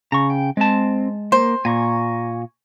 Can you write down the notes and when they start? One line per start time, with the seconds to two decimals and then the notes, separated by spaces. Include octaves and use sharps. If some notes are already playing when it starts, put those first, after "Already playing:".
0.12 C#3 A#5 C#6
0.30 G5
0.57 G#3 C4 A5
1.32 A#3 C5
1.65 A#2 G#5 A#5 C#6